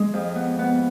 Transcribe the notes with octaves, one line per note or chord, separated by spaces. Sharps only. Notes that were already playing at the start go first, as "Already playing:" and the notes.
Already playing: G#3
F2
B3
B3